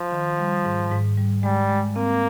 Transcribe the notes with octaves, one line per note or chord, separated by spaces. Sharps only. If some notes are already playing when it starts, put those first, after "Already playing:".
Already playing: F3
D#3
G3
G#2
G#2
G3
G3 G#3
G#3
A#3 C4